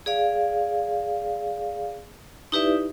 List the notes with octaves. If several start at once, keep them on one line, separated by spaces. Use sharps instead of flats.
G#4 D5 F5
D#4 E4 G4 B4 D5 E5